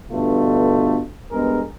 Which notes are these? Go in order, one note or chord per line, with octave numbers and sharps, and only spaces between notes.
G2 B2 D3 A3 F4
G2 G#3 B3 G#4 A#4